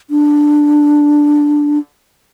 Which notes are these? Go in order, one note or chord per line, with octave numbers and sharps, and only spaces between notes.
D4